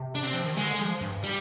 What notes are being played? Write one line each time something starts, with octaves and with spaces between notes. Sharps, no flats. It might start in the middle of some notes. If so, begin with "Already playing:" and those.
Already playing: C3
D4
C4
F3
D#3
D3 G#3
F3
G2
G3